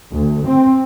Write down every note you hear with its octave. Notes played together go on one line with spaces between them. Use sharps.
D2
C4